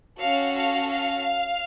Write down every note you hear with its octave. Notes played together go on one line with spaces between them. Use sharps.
C#4 F#4 A4 F5
F5
F5